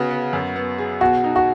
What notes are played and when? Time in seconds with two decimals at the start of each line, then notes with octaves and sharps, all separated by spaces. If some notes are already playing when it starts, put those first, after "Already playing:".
Already playing: C#3 B3 F#4
0.11 B3
0.33 F#2
0.56 B3
0.78 G#4
1.01 B2 F#4
1.24 D#4
1.36 F#4